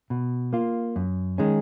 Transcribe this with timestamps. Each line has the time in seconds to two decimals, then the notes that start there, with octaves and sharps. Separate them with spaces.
0.10 B2
0.53 A#3 F4
0.96 F#2
1.38 D#3 G#3 C#4